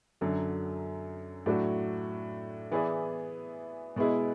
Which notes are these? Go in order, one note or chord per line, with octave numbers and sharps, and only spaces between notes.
F#2 D3 F#3
A2 F#3 A3 D4 F#4
E3 B3 E4 G#4 D5
B2 G#3 B3 E4 G#4